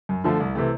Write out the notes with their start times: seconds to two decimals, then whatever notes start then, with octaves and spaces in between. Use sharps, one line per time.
0.09 F#2
0.24 D3 F3 A3
0.40 C2
0.55 C3 E3 A3